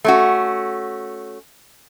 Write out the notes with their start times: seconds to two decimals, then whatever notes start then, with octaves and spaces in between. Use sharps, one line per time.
0.04 A3 C#4 F#4